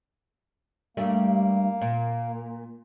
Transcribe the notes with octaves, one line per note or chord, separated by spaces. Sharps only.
G2 G3 A3 A#3
A#2